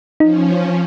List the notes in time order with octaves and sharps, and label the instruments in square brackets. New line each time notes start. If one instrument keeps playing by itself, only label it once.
[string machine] F3 C#4 [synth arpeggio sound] D#4